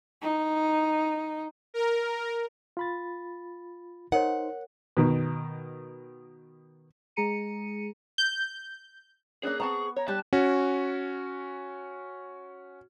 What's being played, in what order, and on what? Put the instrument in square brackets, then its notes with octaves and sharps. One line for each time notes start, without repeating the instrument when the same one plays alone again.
[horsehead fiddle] D#4
[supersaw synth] A#4
[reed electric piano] F4 B5 A6
[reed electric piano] D#4 C5 [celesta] A#4 C#5 [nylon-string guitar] F#5
[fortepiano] B2 D#3
[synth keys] G#3 G#4 A#5 C#7 D#7
[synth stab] G6
[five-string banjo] A#3 C#4 D4 [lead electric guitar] G#4 [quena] F#6
[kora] B3 [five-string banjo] C4 A5 A#5 [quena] C#6
[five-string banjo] C#5 [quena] A#5
[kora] G3 D4 G4 [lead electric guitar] A5 [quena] F#6
[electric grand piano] C#4 F#4